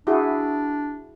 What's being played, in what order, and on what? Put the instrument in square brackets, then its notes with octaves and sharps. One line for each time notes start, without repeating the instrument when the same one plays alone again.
[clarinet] D4 [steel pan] E4 F#4 G#4